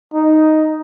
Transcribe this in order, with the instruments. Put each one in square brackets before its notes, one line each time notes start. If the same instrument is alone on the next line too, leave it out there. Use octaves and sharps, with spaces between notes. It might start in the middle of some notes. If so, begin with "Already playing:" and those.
[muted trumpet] D#4